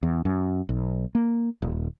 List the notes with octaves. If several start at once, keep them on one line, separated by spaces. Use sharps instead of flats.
E2
F#2
B1
A#3
D#1